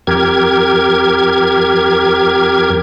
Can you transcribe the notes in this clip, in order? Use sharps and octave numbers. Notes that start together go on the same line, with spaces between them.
F2 G4 A#4 G#6